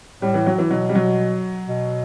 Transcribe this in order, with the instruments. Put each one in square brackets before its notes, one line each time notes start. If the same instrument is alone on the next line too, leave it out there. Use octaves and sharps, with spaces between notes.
[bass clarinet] A2 [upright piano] G3
[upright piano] E3
F#3
E3
[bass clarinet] B2 [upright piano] F#3
[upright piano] G3
F#3
[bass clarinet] B2